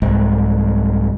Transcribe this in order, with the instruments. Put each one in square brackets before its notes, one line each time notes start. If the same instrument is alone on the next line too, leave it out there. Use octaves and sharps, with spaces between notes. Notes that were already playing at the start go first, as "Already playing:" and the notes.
[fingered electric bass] C2 G#2